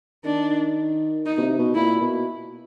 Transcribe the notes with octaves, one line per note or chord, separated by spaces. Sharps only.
D#3 D4
D#4
B2
C3
B2
A#2 E4
B2